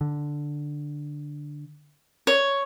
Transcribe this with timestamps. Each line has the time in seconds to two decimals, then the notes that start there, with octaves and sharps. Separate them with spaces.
0.01 D3
2.27 C#5